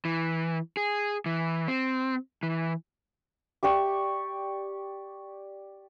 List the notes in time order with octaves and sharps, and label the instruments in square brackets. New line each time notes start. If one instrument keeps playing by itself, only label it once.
[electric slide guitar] E3
G#4
E3
C4
E3
[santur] G4 D5 G5 C#6